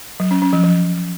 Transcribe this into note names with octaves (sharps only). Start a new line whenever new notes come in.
F#3
C#4
C#4
F3
F3